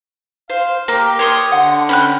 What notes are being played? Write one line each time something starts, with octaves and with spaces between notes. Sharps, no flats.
C5 F5
A#3 G4
C#5 C6 D#6
D3 F#5
C#4 G5 B5 F#6